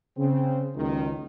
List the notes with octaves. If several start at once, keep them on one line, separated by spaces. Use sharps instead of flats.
C#3 C4
F#1 C#2 D#3